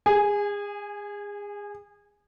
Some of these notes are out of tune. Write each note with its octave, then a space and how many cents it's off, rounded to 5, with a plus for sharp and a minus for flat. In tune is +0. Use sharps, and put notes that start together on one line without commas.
G#4 -30 G#5 +0